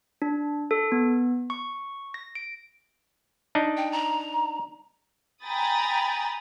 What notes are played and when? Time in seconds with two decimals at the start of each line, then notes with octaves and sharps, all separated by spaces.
0.22 D4
0.71 A4
0.92 B3
1.50 C#6
2.14 A#6
2.35 D7
3.55 D4 D#4
3.77 G5
3.92 A#5
5.42 G5 G#5 A#5 B5 D#6 A6